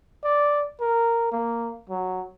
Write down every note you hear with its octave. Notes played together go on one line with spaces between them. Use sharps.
D5
A#4
A#3
F#3